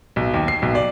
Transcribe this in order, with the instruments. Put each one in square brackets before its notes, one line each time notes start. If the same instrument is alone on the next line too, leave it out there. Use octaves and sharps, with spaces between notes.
[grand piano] B1
D#2
C7
B1
D5